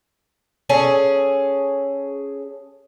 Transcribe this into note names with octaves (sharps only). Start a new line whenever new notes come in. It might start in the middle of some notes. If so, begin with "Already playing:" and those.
C#4 G#4 A4